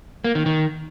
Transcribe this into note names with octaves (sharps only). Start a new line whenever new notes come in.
A#3
D#3
D#3